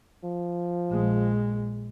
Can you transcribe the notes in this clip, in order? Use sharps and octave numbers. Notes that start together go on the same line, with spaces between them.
F3
A#1 G#3